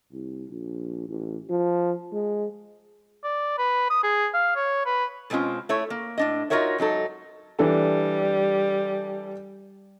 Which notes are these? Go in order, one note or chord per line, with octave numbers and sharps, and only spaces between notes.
C2
A#1
A1
F3
G#3
D5
B4
D#6
G#4
F5
C#5
B4
B2 G#3 C4 C#4 F4
A3 E4 C#5
A#3
A2 D4 D#5
D#4 F4 F#4 A#4 C#5 E5
G#2 F#3 D#4 A4
E3 G3 D4 A4